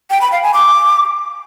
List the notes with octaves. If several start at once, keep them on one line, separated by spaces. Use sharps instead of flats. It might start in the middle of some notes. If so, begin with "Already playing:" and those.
G5
B5
F5
G#5
D6